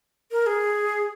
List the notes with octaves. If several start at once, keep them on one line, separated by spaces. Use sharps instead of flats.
A#4
G#4